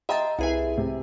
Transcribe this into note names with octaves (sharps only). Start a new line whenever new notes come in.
D#5 E5 G5 A#5 C6 A6
C2 E4 G#4 B4 E5 G#5
C3